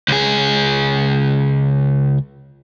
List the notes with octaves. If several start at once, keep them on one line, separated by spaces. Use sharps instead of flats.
C#2 G#4